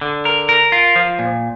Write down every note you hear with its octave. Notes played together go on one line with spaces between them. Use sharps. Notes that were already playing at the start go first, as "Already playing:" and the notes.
D3
A#4
A#4
F4
F3
A#2